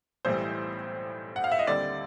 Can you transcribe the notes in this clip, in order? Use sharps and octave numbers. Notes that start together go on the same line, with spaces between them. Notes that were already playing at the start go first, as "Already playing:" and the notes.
B1 A2 E3 G3 C5
F#5
F5
E5
D#5
D#2 D3 G3 C4 D5